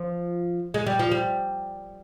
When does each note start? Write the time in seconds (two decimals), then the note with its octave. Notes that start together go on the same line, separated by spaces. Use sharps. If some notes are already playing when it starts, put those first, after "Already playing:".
Already playing: F3
0.74 G#3
0.86 G3
0.99 F3
1.11 G3